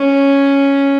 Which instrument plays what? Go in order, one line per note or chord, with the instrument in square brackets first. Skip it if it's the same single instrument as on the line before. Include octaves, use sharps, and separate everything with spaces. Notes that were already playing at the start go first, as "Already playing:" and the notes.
Already playing: [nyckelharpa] C#4